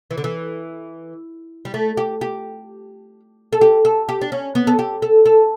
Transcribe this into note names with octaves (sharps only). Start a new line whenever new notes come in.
E3
D3
E3
G3
A3
G4
G4
A4
G4
A4
G4
D4
C#4
B3
A4
G4
A4
A4